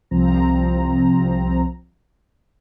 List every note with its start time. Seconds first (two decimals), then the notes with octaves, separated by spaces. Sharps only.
0.11 C2 F3 C4 A#5